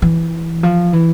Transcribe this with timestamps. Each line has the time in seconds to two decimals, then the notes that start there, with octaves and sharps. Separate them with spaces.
0.02 E3
0.63 F3
0.93 E3